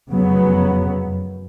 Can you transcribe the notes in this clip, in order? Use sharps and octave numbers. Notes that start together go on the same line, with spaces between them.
F1 F#2 C#3 F#3 B3
F#2